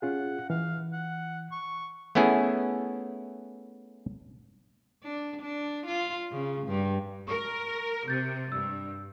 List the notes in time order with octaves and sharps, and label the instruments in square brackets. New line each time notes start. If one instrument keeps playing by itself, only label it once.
[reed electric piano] C#4 F4 G#4 [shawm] F#5
[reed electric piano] E3 [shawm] F5
[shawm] F#5
C#6
[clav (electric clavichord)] A3 B3 C#4 E4 G#4
[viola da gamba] D4
D4
F4
C#3
G2
[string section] A#4 [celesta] C#6
[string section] C3 [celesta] G6 A6
[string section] G2 [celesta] E6